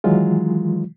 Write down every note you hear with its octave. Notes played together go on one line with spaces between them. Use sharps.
D#3 E3 F#3 G#3 F4